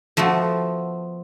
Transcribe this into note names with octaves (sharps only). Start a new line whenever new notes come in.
F3 A3 B3 F#4